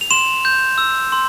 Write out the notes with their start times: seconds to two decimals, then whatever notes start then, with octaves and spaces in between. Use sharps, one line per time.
0.01 F7
0.11 C6 E7
0.45 G6
0.78 E6
1.12 C6